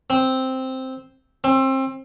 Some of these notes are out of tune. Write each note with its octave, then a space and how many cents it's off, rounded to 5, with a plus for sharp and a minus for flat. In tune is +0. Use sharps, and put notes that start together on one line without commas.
C4 +0
C4 +30